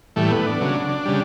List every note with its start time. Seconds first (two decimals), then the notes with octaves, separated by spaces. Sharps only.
0.16 A2 E3 G3 A3
0.30 B3
0.46 D4
0.60 C#3 F#3
1.05 C#3 G3